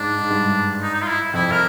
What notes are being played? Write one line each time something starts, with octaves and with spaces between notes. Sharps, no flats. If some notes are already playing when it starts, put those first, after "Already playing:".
Already playing: G#2 D4
G#2
G2
D#4
D#4
F4
E4
F2 E4
A#4